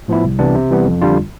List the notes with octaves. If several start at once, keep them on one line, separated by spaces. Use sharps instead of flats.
A2 F3 B3 E4
C2
C3 E3 B3 D4
C3
E3 G3 B3
F2
D3 G3 D4 F4